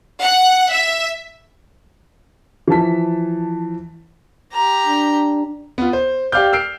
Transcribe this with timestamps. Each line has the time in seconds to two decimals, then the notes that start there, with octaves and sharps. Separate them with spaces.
0.22 F#5
0.72 E5
2.68 E3 F3 A5 B6
4.52 G4 A#5
4.86 D4
5.78 B3 F4
5.93 C5
6.32 G4 D5 F5 D6 F6 G6
6.53 E6 F6 C7 D7